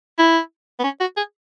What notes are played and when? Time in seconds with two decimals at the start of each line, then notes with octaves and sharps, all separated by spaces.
0.18 E4
0.79 B3
0.84 C#4
1.00 F#4
1.17 G#4